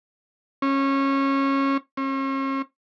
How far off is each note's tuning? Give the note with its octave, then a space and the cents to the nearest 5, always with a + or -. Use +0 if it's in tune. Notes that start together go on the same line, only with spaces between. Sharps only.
C#4 -20
C#4 -40